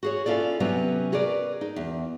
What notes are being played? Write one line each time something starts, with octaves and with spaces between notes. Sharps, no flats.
F#4 G#4 C#5
C#4 E4 F4 A4 D5
C3 F#3 G3 B3 C#4
F#4 G#4 A#4 B4 D5
D#4
E2